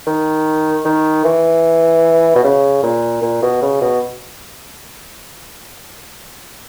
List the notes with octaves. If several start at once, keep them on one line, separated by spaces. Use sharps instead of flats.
D#3
D#3
E3
B2
C#3
A#2
A#2
B2
C#3
B2